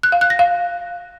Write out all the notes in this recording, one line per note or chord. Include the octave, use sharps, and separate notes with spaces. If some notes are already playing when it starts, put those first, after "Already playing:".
F#6
F5
F#6
A#6
F5